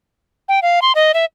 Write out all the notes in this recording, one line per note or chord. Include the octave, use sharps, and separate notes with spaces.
G5
F5
C6
D#5
E5